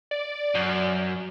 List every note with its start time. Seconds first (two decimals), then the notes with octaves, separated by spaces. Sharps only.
0.11 D5
0.55 F#2